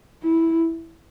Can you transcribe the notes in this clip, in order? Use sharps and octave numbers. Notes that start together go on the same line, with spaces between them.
E4